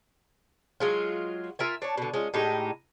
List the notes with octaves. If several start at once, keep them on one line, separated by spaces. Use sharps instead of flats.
F#3 G#3 F4
F4 A#4 E5 G#5
D4 C#5 A5
B2 D3
G#3 C#4 F4
A2 G#3 D#4 G4